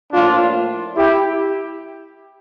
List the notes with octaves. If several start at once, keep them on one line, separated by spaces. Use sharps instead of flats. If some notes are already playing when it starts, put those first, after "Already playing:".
A2 F3 A#3 D4 F4
E4 G4